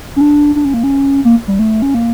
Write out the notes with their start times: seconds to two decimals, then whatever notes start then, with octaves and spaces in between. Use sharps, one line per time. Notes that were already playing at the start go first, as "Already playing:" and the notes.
0.16 C#4
0.21 D4
0.55 D4
0.65 C#4
0.74 A#3
0.84 C#4
1.25 A#3
1.48 G3
1.59 A3
1.82 C#4
1.94 A#3